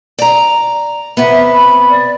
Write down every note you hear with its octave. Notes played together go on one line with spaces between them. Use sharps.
D5 A#5
C3 B3 E5
B5
D5